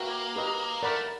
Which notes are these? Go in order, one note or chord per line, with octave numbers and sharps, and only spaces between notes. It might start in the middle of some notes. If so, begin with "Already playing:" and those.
Already playing: A#3 F#4 B4 E5 G5
G4 B4 D#5
A3 A#4 D5 F#5 B5